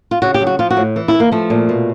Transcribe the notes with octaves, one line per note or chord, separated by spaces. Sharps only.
F4
C#3 F#4
G4
F#3
F#4
F3 F4
F#4
A2
E3
E4
E3
A#3
F3 A3
A#2
B2